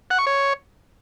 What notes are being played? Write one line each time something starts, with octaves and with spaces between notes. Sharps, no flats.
F#5
C#6
C#5